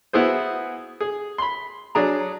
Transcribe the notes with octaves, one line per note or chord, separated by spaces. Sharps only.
B3 E4 F#4 G#4 C5
G#4
B5 C6
F#3 D4 G#4 A#5